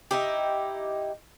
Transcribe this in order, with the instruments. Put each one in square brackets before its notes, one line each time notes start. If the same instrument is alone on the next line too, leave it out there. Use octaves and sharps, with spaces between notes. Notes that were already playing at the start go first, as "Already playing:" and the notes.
[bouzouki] D#4 E4 G4